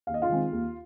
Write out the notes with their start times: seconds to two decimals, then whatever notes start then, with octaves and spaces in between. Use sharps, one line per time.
0.07 D#2 F5
0.14 D#5
0.22 F4 F5
0.29 D#3 G#3 C4
0.52 D#2